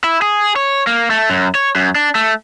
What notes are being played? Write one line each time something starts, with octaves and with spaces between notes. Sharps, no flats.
E4
G#4
C#5
A#3
A3
F#2
C#5
F#2
D4
A3